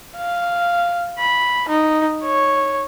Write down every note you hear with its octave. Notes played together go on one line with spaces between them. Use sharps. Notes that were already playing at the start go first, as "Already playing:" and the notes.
F5
B5
D#4
C#5